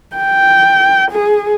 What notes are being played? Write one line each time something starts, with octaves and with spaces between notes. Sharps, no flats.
G5
G#4